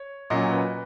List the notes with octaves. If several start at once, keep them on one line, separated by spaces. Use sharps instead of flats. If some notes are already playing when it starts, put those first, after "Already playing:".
Already playing: C#5
A#2 F#3 C#4 D#5
B4